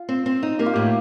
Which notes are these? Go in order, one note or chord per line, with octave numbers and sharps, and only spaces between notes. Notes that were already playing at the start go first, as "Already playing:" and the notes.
Already playing: F4
C4
C4
D#4
A#3 G4
F4
A2 G4